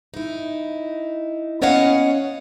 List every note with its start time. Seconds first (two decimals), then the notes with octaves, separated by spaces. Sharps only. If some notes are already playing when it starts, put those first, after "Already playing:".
0.14 D#4 E4
1.62 B3 C#4 C#5 D#5 F5 F#5